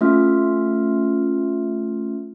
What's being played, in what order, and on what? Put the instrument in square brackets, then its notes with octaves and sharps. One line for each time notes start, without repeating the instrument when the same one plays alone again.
[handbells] A3 C#4 F4 E5 F6